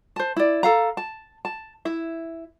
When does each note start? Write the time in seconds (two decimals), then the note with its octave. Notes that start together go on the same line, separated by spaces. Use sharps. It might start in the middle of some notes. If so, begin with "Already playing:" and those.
0.16 C5 A5
0.36 E4 D5
0.63 A4 F5 A#5
0.97 A5
1.45 A5
1.85 E4 E5